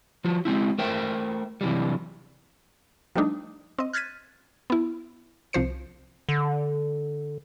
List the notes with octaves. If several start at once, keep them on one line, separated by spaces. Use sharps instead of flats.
F3 F4 F#4
G#3 C4 E4
A3 A#4 C5 E5 G5
C3 E3 F#3 G3
F3 G3 A3 D4 D#4
C4 D#5
F6 F#6 G#6 A6 B6 D#7
B3 E4
C2 F3 C5 C#7
D3